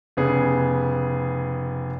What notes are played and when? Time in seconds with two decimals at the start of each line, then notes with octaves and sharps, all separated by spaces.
0.17 F1 C#3 B3 G#4